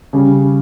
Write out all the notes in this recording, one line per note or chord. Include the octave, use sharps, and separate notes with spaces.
C#3 G3 C#4